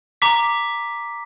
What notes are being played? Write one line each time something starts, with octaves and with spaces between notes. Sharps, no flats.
A#5 D6 B6